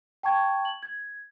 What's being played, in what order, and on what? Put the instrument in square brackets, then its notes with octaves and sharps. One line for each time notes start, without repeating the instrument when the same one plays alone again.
[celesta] G5 A5 C#6 G#6
F#7
G#6